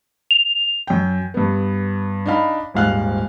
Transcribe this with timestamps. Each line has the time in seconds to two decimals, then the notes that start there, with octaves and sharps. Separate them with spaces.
0.31 F7
0.87 F#2 G5
1.34 G2 B3
2.26 D4 D#4 F5 B5
2.74 D#1 G#2 G3 F5 F6 F#6